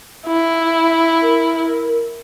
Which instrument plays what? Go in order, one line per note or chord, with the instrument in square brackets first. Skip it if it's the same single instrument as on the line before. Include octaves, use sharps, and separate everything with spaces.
[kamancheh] E4
[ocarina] A#4